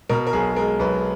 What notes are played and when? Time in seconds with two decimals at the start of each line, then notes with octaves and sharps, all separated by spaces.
0.09 B2 A#4
0.27 A#4
0.33 B1 G#4
0.56 G#3 A#4
0.79 B1 B4